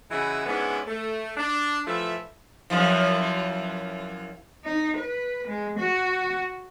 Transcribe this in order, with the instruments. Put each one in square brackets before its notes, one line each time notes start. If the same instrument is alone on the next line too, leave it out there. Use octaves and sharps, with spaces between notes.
[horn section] C#3 E3 G#3 E4 F#4 E5
G#2 G#3 B3 C#4 D4 E4
A3
D4
E3 F3 A3 E5
[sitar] F#2 E3 F3
[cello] D#4
B4
G#3
F#4